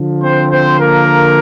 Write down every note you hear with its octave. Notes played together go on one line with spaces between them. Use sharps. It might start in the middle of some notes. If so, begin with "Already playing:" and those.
Already playing: D3 F3
C4 C5
C4 C5
A#3 A#4